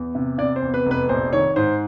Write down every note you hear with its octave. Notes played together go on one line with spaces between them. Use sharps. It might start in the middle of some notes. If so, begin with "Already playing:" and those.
Already playing: E2
C3
C3 D5
C5
E2
B4
F1
B4
A#1 C5
D#3 C#5
G#2 C5